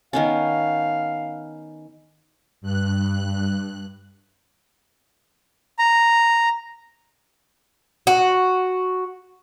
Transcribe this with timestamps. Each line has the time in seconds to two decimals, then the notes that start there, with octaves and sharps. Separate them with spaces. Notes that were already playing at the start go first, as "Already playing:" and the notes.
0.13 D#3 B3 C#4 F5
2.61 G2 F#6
5.79 A#5
8.07 F#4